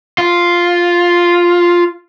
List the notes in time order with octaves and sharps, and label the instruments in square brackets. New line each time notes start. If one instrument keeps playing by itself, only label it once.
[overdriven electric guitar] F4